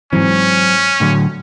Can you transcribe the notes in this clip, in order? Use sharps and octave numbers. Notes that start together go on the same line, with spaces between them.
G#2 E3 F#3 C4 C#4
A2 D3 F#3